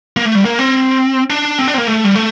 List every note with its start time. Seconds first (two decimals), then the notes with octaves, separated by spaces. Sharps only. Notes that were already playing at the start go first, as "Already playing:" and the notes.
0.16 A#3
0.25 A3
0.35 G3
0.45 A#3
0.59 C4
1.30 D4
1.59 C4
1.68 D4
1.74 C4
1.78 A#3
1.87 A3
2.04 G3
2.15 A3